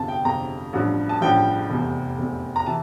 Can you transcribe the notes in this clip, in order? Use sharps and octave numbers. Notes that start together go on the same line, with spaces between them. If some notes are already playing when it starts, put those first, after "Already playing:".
Already playing: G1 F2 C3 A5
G5
G1 F2 C3 A#5
A1 G2 F3
A5
A1 G2 F3 G5
F1 E2 C3
F1 E2 C3
A#5
C3 E3 A5